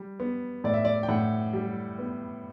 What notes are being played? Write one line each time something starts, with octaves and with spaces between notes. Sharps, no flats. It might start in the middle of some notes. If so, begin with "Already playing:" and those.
Already playing: G3
B3
A2 D5
E5
D5
G5
A2 F#5
G3
B3